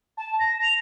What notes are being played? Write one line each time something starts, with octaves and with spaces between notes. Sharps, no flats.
A5
A#6
F7